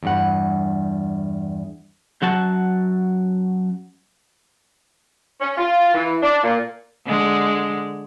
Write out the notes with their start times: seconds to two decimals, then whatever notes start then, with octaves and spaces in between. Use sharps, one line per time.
0.03 E2 G2 F#5
2.22 F#2 F#3 F#4 A5
5.41 C#4
5.57 F4
5.94 E3
6.23 D4
6.44 A#2
7.06 D3 G#3